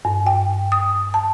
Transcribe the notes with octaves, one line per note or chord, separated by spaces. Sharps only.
G2
G5
D#6
A5